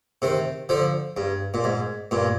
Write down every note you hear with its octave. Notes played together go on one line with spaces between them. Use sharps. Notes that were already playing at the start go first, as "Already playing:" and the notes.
C3 D#3
D3 F3
G2
A#2
G#2
G2 A#2